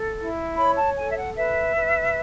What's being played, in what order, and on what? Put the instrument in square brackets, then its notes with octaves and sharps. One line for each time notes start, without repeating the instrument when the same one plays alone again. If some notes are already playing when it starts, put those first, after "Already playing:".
Already playing: [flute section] A4
E4
C#5 B5
A5
A4 G#5
E5
F#5
B4 E5
B4